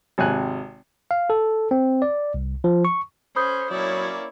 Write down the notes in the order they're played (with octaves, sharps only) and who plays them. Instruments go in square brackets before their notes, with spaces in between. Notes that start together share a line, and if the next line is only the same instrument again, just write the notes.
[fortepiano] G#1 C3 G#5 F#6
[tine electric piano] F5
A4
C4
D5
C2
F3
C#6
[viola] C#4 [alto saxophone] C5 [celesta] B5 D#6 G6
[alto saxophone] F#3 [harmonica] A#3 C#4 D5 [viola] E4 C#5